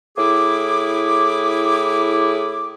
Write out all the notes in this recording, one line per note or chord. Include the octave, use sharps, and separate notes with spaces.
A2 E4 G#4 D6